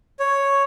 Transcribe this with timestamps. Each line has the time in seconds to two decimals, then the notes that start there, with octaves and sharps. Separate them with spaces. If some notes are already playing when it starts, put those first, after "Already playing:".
0.20 C#5